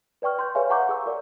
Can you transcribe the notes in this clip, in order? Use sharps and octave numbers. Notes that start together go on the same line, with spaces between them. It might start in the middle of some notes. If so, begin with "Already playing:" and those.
B4 D5 G5 C#6 F6
C6 G6
G#4 B4 C#5 E5 F5 G#5
F#5 A#5 C#6 D6 G6
G#4 E6
A#4 D5